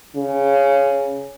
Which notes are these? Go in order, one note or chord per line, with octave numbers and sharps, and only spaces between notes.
C#3